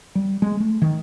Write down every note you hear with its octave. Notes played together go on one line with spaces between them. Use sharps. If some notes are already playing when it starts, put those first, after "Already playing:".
G3
G#3
A3
D#3